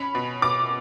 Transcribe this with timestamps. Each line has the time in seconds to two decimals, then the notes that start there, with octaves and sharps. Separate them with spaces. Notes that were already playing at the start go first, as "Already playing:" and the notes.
Already playing: C#4 B5
0.15 B2
0.42 B2 D6